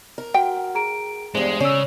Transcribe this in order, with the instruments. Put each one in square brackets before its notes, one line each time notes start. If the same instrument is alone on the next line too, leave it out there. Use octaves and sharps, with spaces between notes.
[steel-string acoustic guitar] A#4
[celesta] F#4 F#5 [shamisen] G5
[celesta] G#4 A#5 D7
[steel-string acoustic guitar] E2 G2 [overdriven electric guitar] G#3 [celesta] C5
[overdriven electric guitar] C#3 [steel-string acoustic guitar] C#4 [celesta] D5 E6